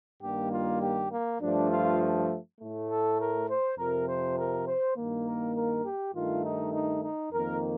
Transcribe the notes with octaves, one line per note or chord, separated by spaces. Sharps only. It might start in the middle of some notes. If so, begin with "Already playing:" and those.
G2 D#3 G3 A#3 G4
F4
G4
A#3
G2 F3 A3 D4
F4
A2 A3
A4
A#4
C5
F2 C3 F3 A#4
C5
A#4
C5
G2 D#3 A#3
A#4
A#4
G4
G2 D#3 A3 F4
D#4
D#4
D#4
F2 D#3 A#3 A#4